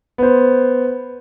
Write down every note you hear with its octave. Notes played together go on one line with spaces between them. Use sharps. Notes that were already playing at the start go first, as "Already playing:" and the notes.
B3 C5